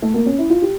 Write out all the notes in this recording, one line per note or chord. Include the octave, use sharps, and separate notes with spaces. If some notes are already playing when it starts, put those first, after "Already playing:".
A3
A#3
C#4
E4
F4
G4